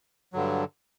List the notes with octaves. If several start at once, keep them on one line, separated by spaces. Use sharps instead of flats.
G2 D3 F#3